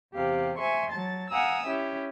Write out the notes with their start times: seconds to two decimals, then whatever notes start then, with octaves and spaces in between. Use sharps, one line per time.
0.13 E2 C3 G4 F5
0.58 E5 G#5 C6 C#6
0.91 F#3 A5 A6
1.31 F5 F#5 G#5 A#5 D#6 E6
1.67 C#4 E4 G4 E5